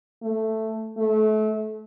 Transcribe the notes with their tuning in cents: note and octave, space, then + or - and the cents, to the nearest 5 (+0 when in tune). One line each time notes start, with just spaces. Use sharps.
A3 +5
A3 -30